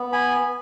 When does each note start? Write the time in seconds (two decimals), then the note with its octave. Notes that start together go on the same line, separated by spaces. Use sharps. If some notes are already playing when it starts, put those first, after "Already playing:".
Already playing: B3
0.12 G#5 B5